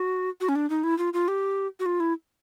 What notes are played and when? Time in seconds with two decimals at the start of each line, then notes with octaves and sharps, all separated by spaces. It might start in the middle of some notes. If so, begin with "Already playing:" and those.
Already playing: F#4
0.41 F#4
0.49 C#4
0.56 D4
0.70 D#4
0.84 E4
0.98 F4
1.14 F4
1.28 G4
1.80 F#4
1.86 F4
2.00 E4